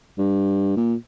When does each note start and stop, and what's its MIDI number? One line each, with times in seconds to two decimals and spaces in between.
0.18 0.76 43
0.77 0.94 46